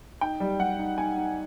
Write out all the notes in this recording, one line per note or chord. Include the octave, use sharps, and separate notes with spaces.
D#4 G5
G3
G3 F#5
D#4
D#4 G#5
D#4